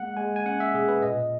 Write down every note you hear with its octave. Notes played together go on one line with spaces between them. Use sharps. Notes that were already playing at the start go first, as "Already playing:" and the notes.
Already playing: G#3 A#3 F#5
G#3 G#5
G#5
C#4 F#5
E5
B2 G#4
B4
A#2 D#5